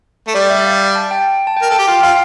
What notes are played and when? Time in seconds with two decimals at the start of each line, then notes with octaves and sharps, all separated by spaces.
0.27 A3
0.34 G3 D5
0.50 E5
0.65 F5
0.95 A5
1.11 G5
1.47 A5
1.57 G5
1.62 A#4
1.70 A4 G5
1.79 G4
1.87 F4 G5
2.02 F4 F5